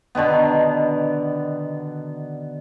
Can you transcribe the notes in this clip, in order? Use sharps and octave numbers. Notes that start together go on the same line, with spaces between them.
B2 D3 D#3 B3